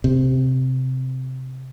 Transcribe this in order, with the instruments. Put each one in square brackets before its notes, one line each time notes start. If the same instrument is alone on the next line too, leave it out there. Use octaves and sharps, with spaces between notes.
[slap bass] C3